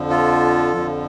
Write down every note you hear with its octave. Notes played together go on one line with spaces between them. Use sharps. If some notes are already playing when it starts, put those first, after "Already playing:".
Already playing: F2 D3 F3
F4 A4
F2 D3 F3